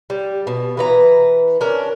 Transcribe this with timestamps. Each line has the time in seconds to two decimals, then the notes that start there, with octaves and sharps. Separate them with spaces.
0.10 G3
0.47 B2
0.77 E3 B4 A#5
1.61 C#4 D4 A#4